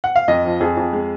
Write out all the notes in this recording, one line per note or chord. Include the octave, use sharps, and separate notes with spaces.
F#5
F5
F2 D#5
F3
F2 G#4
F2
G#3